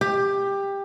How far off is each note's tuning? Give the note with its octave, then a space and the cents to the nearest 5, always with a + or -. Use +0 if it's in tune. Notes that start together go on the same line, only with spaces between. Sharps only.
G4 +15